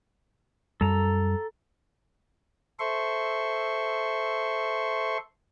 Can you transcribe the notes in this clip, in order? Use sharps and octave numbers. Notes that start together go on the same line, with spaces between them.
F#2 G3 A4 A#5
A4 C5 E5 C6 C#6